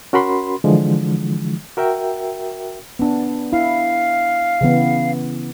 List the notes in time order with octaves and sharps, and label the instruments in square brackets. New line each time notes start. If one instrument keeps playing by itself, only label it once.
[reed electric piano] C#4 F#4 A#4 B5 C6
D3 E3 F3 G#3
F#4 A#4 E5 G5
[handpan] B3 D4
[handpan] E4 [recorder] F5
[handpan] C#3 E3 B3